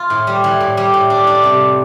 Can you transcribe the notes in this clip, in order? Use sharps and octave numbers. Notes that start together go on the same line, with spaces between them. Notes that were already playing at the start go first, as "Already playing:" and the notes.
Already playing: F4
A2
G3
E3
A2
G3
A2
D4
D4
C3